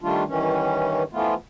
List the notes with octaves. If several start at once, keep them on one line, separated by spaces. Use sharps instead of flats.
D#3 G3 A3 D4 F4
G2 D#3 E3 C#4
E3 F3 A3 B3 F4